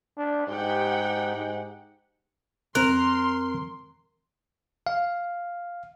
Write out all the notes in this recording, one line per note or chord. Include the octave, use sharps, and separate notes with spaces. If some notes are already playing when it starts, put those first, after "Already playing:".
D4
G#2 G4 F#5 G5
G#2
F2 C4 A#4 C6 F#6
F5